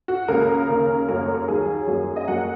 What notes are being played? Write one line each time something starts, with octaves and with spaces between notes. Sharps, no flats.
F#4
C#2 C#3 A#3 A#4
D#2 C#3 A#3
F#2 F#3 A#3 A#4
C#5
A#4
D#2 D#3 F#3 G#4
F#2 F#3 A#3
D#5
F#2 F#3 A#3 F#5